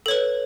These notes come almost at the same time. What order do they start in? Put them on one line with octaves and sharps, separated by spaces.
A4 C#5 B4